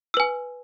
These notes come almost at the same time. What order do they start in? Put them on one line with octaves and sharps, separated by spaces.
E6 B4 G#5